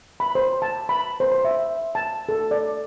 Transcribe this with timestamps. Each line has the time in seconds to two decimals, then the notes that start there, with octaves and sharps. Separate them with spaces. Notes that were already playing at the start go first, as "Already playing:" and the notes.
0.20 B5
0.35 C5
0.62 A5
0.89 B5
1.20 C5
1.32 C5
1.45 E5
1.95 A5
2.29 A4
2.51 D5